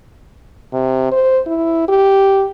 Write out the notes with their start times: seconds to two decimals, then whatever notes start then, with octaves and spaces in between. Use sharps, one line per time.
0.73 C3
1.12 C5
1.46 E4
1.88 G4